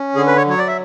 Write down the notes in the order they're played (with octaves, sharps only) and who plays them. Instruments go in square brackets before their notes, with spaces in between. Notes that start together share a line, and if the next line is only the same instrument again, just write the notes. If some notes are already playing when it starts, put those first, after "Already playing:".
Already playing: [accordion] C#4
D3 G#4
B4
C#5
F#3 C#5
D5
E5